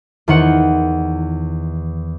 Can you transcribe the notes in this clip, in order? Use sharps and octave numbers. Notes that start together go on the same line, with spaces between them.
E2 D#3 C5 F#5 C#7